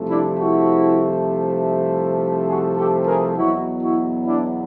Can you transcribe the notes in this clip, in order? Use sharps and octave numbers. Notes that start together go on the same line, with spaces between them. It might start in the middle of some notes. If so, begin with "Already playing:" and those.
Already playing: C2 C3 F3 A3
D4 E4
E4 F#4
F#4 G#4
G4 A4
G#4 A#4
E2 B2 F#3 B3 E4 F#4
E4 F#4
D4 E4